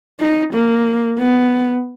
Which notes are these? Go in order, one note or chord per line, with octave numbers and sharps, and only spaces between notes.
D#4
A#3
B3